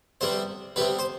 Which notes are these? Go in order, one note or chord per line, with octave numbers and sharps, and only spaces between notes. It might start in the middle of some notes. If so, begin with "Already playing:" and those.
C3 G3 B3 C5
C3 G3 B3 B4
C5